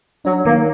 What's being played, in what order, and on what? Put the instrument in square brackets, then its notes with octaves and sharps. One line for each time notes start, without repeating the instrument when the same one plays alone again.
[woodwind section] F#3 [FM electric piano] D4
[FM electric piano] D#3 [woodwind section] A#3